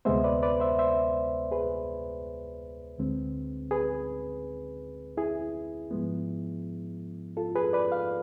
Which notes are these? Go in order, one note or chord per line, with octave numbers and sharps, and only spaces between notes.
D2 C3 G#3 B3 C5 E5
B4 D5
B4 D5
C5 E5
C5 E5
G#4 B4
D2 D3 G#3 C4
G#4 B4
E4 G#4
G#2 F3 G#3 B3
F4 A4
G#4 B4
B4 D5
F5